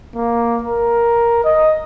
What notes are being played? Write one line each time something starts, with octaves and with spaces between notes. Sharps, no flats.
A#3
A#4
D#5